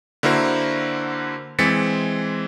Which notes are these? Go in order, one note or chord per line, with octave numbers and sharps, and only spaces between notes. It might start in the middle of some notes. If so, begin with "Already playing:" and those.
D3 A#3 E4 F#4 A#4 C5
E3 G#3 C4 A6 B6 C#7